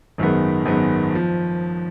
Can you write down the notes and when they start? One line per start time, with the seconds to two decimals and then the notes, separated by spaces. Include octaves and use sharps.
0.18 G#1 F#2 D#3 G#3 B3
0.65 G#1 F#2 D#3 G#3 B3
1.15 F3